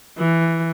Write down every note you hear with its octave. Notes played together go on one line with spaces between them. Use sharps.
E3